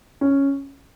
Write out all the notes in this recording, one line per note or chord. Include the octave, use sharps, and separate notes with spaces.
C#4